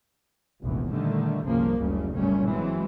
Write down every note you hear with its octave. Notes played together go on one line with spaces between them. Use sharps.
F1 A#1 E2 G#2
A#2 D3 D#3 G3 A3
G1 C2 C#3 F3 A#3
F#1 D2 C#3 G3
F#1 G2 A#2 G3 A3 C#4
E3 F#3 G#3 C4